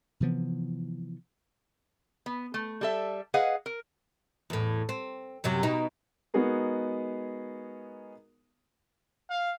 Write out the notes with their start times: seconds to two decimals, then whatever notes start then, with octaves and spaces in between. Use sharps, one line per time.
0.20 C3 E3 F3 B3
2.26 B3
2.54 A3
2.81 G3 A4 E5
3.34 G#4 B4 D#5 F5 F#5
3.66 A#4
4.50 E2 A2
4.89 C4
5.44 F#2 C3 F#3
5.63 B2 D#4
6.34 G#3 B3 D#4 F#4 G#4 A#4
9.30 F5